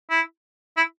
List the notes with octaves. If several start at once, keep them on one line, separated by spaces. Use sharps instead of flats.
E4
E4